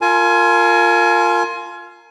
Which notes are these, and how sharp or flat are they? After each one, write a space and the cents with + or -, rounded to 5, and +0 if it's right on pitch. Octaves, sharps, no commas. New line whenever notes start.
F4 +0 A#4 -25 G#5 +25